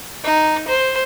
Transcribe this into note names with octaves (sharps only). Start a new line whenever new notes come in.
D#4
C5